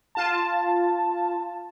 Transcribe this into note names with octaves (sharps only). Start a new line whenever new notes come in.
F4 A5